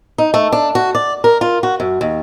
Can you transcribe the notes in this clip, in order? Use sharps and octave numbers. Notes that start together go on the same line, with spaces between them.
D#4
A3
D4
F#4
D5
A#4
F4
F#4
F#2
D#2